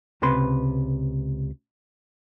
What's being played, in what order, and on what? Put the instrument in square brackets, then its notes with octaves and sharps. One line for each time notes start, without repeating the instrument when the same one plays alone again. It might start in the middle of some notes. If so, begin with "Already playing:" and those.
[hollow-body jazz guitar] C#2 C3 B4 C6